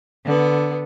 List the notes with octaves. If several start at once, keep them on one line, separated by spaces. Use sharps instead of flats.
D3 B3